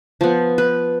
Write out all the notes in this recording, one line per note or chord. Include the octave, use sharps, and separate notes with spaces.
F3 B3
B4